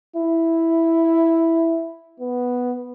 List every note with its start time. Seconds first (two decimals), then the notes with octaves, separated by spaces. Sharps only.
0.16 E4
2.20 B3